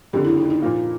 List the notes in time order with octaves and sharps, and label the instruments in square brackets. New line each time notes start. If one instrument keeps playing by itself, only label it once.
[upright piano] F#1 F2 D3 [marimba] G4
[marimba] E4
D#4
D#4
[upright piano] A#2 F3 A#3